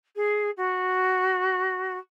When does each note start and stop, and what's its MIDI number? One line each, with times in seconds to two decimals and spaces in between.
0.16 0.50 68
0.57 1.97 66